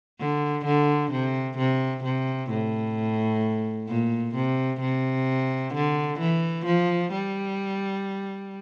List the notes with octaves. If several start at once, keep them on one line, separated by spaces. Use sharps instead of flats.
D3
D3
C3
C3
C3
A2
A#2
C3
C3
D3
E3
F3
G3